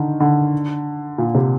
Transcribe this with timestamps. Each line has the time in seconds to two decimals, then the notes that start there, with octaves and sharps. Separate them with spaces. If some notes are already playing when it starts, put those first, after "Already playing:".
Already playing: D3 D#3
0.20 D3
1.18 A#2
1.35 C3